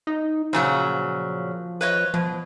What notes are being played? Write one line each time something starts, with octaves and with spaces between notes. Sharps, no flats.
D#4
A#2 C#3 F3 F#3
B4 C#5 D#5
B2 F3